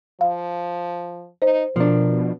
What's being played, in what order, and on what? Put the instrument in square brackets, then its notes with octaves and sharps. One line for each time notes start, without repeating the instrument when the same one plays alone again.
[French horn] F3 [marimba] F5
[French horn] D#4 [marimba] C5
[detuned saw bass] B2 [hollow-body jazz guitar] F3 D4 [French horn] A#4